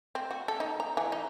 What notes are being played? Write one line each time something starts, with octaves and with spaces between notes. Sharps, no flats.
C4
F#4
A4
D#4
A#5
E3
D#4